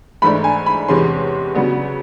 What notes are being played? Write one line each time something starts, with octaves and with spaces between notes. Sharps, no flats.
G#2 E3 A3 D4 B5
G#5
B5
E2 C3 E3 G#3 C#4 C6
C#3 F#3 B3 D4